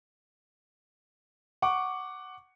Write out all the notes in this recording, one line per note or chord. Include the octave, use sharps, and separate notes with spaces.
F#5 C#6 D6